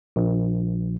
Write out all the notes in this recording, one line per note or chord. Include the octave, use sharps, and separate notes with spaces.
A#1